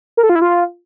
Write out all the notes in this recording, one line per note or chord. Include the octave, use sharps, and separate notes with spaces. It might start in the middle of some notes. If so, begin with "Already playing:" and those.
A#4
A4
F4
E4
F4